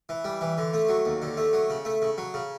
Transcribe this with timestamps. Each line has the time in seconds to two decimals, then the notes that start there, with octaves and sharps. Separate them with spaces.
0.09 E3
0.25 G3
0.41 E3
0.58 D3
0.74 A3
0.89 F#3
1.05 D#2
1.22 D3
1.37 A3
1.53 F#3
1.70 C#3
1.85 A3
2.02 C#3
2.18 F#3
2.34 C#3